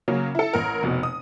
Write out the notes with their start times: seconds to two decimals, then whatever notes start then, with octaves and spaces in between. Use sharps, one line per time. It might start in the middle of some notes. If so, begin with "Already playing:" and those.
0.08 C#3 F#3 A#3 C#4
0.35 E4 A4
0.53 A1 A#4
0.83 F1 B2
1.03 D#6